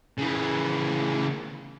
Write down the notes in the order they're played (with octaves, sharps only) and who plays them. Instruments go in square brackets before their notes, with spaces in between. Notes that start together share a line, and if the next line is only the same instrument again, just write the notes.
[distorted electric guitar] C#3 E3